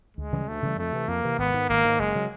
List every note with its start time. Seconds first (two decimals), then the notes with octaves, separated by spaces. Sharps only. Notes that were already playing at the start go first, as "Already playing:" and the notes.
0.17 D2 G#3
0.33 C#3 E3 G3
0.47 D2 A3
0.62 C#3 E3 G3
0.78 F2 A3
0.92 C3 E3
1.08 F2 A#3
1.24 C3 E3
1.38 G#1 B3
1.54 G#2 D#3
1.69 G#1 A#3
1.84 G#2 D#3
1.99 F#1 G#3
2.15 C#3 F#3